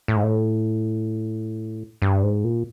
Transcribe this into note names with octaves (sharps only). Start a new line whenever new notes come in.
A2
G#2
A2
G2
G#2
A#2